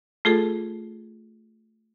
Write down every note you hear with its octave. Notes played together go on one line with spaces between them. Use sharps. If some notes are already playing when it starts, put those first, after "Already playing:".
A3 F4 G#4 A4